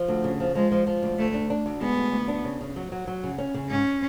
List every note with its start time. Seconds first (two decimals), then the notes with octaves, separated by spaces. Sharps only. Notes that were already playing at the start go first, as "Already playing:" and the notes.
Already playing: F3
0.08 D2
0.24 C#3
0.40 F3
0.55 F3 G#3
0.71 F3
0.87 F3
1.03 D2
1.18 D2 A3
1.34 D4
1.50 D4
1.66 D2
1.81 G#3 B3
1.97 D2
2.12 D2
2.28 D4
2.44 C#3
2.61 C#3
2.76 F#3
2.92 F#3
3.07 F#3
3.23 C#3
3.38 C#4
3.54 C#3
3.70 G#2 C#4